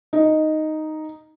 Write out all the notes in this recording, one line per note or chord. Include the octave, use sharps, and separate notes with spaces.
D#4